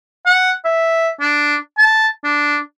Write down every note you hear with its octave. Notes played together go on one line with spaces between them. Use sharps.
F#5
E5
D4
A5
D4